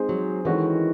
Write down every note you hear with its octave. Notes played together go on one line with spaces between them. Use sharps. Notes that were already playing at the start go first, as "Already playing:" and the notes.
Already playing: G#3 C4 D#4 G#4 C5
F#3
D#3 E3 G#3 C#4 F#4 A4